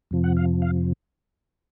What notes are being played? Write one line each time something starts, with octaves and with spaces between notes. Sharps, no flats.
F2 C3 F3
F#5
F5
F5